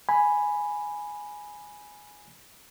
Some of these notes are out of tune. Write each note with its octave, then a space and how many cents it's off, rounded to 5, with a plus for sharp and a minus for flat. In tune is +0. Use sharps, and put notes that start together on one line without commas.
G#5 +0 B5 +0